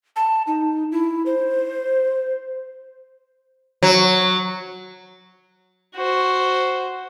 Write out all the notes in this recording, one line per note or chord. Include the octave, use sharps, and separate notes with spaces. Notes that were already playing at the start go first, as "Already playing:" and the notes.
A5
D#4
E4
C5
F#3
F#4 C5